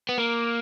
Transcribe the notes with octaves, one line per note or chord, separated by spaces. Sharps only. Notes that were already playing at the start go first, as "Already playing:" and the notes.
B3
A#3